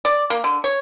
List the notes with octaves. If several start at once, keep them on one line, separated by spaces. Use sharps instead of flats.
D5
A#3
D3
C#5